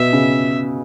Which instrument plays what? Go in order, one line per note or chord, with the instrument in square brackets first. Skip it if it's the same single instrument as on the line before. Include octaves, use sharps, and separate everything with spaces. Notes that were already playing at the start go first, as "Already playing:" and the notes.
Already playing: [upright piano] B2 [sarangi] E5
[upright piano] C#3